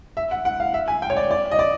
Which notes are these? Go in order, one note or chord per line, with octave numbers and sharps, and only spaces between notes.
E5
F#5
F#5
F5
E5
G#5
G5
C#5
D5
D5
D#5
D5